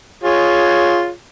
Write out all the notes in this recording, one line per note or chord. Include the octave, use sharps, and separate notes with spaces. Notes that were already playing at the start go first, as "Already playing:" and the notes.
F4 G#4 C#5